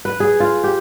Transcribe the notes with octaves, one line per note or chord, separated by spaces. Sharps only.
B4
G#4
F4
G4